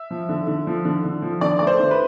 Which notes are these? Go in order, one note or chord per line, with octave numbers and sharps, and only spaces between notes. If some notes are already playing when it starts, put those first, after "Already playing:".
Already playing: E5
F3
D3
D3
F3
D3
D3
F3
D3 D5
A3 D5
C5
D3
B4